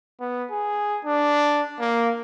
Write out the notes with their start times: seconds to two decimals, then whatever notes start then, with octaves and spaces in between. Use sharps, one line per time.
0.20 B3
0.51 G#4
1.05 D4
1.79 A#3